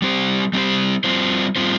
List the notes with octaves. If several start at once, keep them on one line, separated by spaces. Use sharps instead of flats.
G3 C4 G4 C5
G3 C4 G4 C5
G3 C4 F4 C5
G3 C4 F4 C5